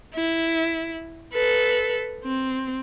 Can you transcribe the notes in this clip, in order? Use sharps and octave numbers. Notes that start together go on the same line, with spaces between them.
E4
A4 B4
C4